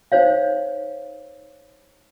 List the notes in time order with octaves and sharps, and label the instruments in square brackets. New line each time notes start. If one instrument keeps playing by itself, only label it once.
[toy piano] D#4 C5 C#5 F5